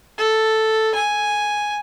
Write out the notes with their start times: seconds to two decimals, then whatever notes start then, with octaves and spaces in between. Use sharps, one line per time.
0.18 A4
0.94 G#5